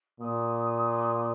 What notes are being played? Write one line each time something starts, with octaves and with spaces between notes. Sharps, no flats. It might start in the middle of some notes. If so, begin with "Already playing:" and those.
A#2 D#6